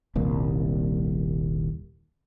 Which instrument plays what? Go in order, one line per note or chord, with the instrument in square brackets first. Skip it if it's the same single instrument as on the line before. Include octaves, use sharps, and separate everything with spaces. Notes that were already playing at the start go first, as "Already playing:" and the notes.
[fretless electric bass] D#1 C2 A#3